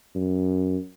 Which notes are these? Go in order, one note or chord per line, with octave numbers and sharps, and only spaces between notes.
F#2